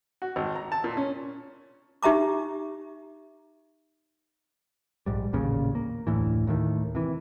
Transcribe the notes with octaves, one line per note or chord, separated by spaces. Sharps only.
F#4
G#1
A#5
A5
A#2
C#4
D#4 G4 E5 A#5 D6
A#1 G#2 G3
A1 D#2 A#2 C#3
A#3
F1 D2 A2 E3
D#2 A2 D#3
C3 E3